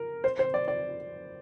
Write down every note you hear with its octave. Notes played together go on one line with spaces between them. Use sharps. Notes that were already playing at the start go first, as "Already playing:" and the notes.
Already playing: A#4
C5
C5
D5
D5